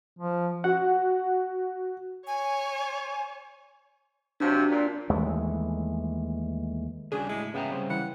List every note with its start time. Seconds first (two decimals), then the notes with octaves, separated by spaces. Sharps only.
0.19 F3
0.64 F#4 F#5
2.27 C#5 G#5
4.40 C3 F3 F#3 D4 A5
4.70 A#2
5.10 D#2 E3 G#3 A3
7.12 C#3 G3 D4 F#4 G#4
7.29 A2 G#3 E4
7.54 G#2 C#3 B3 E5 G5 A#5
7.71 G3 C4 C5
7.90 E3 F#5